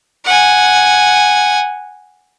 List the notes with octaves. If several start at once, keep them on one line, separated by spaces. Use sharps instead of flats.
F#5 G#5